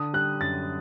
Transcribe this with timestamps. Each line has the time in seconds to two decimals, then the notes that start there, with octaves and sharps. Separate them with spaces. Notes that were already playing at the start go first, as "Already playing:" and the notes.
Already playing: D3 D#6
0.13 G3 F#6
0.40 F#2 A6